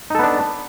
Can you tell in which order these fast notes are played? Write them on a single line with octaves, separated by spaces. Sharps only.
D#4 A4 B3 D4